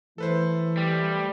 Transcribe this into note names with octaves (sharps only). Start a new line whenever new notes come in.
E3 A3 A4 B4 C5
G3